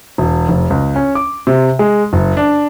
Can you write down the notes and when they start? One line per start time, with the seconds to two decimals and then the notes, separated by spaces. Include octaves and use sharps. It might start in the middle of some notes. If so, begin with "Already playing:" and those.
0.18 E1
0.48 F1
0.70 C#2
0.96 C#4
1.15 D6
1.47 C3
1.79 G#3
2.13 F#1
2.37 D4